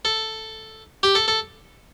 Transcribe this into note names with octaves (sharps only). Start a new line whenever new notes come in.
A4
G4
A4
A4